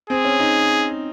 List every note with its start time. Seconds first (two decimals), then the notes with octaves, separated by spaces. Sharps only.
0.10 C4 G#4
0.25 C#4
0.40 D#4